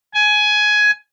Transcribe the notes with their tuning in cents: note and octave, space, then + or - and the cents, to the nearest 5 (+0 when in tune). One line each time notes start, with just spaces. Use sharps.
G#5 +15